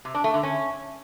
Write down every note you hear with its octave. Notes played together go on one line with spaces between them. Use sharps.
C3
D4
A3
D3
C#4